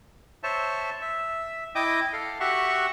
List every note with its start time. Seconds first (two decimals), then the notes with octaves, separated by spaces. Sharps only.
0.43 C5 C#5 E5 A5
1.01 E5
1.75 E4 D#5 G5 D6 D#6
2.13 A4 F5
2.40 F#4 G4 E5 F#5 C#6